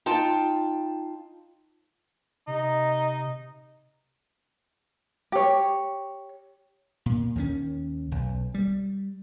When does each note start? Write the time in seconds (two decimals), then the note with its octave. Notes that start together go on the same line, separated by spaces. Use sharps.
0.06 D#4 F4 G5 A5
2.47 C3 D#4
5.32 G4 C#5
7.06 A#2
7.35 D#2 D#3 E3 C#4
8.11 B1
8.54 G3